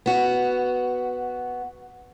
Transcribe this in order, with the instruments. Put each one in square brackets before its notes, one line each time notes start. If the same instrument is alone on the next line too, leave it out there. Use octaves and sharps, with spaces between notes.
[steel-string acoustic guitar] B3 F#4